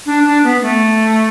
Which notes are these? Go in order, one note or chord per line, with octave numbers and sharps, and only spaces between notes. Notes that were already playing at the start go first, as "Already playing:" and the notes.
D4
D4
B3
A3